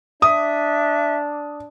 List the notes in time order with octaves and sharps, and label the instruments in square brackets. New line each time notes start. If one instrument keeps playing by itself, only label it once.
[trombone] D4 [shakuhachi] E5 [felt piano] D#6